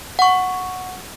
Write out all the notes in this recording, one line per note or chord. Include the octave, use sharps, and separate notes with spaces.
F#5 C#6